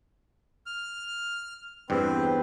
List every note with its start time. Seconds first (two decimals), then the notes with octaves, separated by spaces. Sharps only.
0.66 F6
1.90 E2 G2 B3 C4 B4 C5